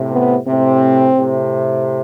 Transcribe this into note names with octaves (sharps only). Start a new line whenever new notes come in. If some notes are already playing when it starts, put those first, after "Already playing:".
Already playing: A2 C3
B3
A2 C3 C4
A2 C3